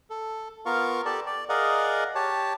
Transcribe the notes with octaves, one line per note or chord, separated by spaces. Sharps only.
A4
B3 F4 A#4 F5 C#6
G4 A4 D5 A5
D5
G#4 A#4 D5 D#5 F5 F#5
G4 C#5 A5